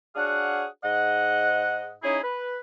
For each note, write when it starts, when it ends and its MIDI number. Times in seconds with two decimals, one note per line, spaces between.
0.16 0.65 62
0.16 0.65 66
0.16 0.65 68
0.16 0.65 73
0.16 0.65 77
0.16 0.65 78
0.84 1.92 44
0.84 1.92 75
0.84 1.92 78
2.03 2.18 61
2.03 2.18 63
2.03 2.18 64
2.03 2.18 68
2.23 2.58 71